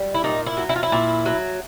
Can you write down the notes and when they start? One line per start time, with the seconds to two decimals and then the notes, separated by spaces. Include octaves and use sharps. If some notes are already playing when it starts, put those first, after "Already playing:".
Already playing: G3
0.14 E4
0.24 A#2 D#4
0.46 E4
0.57 F#3
0.69 E4
0.76 F4
0.83 E4
0.92 A#2
1.26 F#3